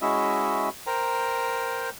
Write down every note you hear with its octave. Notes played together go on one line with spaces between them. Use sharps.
G#3 C#4 E4 F#4 D#5 E5
A#4 C5 G5 A#5